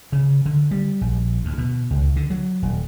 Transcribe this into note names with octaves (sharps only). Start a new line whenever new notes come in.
C#3
D3
G3
A#1
D2
B2
C#2
D3
F#3
D#1